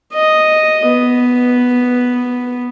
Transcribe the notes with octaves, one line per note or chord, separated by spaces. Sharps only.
D#5
B3